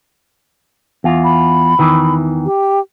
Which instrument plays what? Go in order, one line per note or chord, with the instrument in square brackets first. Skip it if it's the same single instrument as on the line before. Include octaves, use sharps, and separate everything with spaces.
[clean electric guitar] E2 F4
[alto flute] B5
[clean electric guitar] E2 D#3 E3
[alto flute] G4